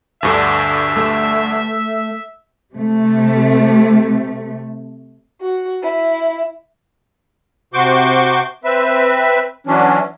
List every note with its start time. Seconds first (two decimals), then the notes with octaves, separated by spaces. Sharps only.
0.23 D2 G2 D3 E5
0.97 A3
2.74 C3 A3
5.41 F#4
5.83 E4
7.74 C3 F#4 C5 C#6 D6 G6
8.64 C4 B4 E5
9.67 E3 F#3 C#4 D4